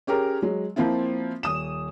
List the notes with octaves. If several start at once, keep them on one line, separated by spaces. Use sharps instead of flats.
C#4 G4 G#4 A#4
F#3 G#3
F3 A#3 C4 E4 F4
D#1 D#6 E7